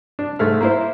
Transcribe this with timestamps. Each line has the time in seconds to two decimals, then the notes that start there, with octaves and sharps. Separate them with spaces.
0.19 D4
0.39 G#2 A3 F6
0.61 A#3 E4 C5